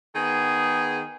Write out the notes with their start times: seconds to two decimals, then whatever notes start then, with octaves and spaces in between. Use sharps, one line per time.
0.16 D#3 B3 G#4